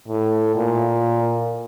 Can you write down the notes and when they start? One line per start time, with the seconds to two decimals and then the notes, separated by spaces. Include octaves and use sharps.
0.08 A2
0.56 A#2